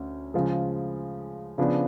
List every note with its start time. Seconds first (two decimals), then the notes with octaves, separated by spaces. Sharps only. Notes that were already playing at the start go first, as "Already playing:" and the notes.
Already playing: D2 C#4
0.34 C#3 F3 G#3
1.58 C#3 F3 B3 D4